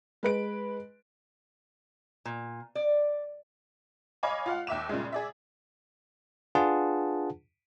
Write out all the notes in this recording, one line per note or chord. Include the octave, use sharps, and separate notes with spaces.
G#3 B4 D7
A#2
D5
C#5 D#5 F5 G#5 B5 D6
F4 F5 F#5
D#2 E5 D6 E7
A#2 C#3 G3 G#3
G#4 D5 E5
D4 F4 G#4 B4 F#5 A5